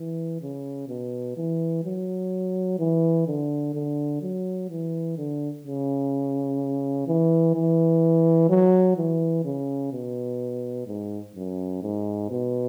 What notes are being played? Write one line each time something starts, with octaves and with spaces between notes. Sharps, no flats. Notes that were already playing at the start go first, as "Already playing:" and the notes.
Already playing: E3
C#3
B2
E3
F#3
E3
D3
D3
F#3
E3
D3
C#3
E3
E3
F#3
E3
C#3
B2
G#2
F#2
G#2
B2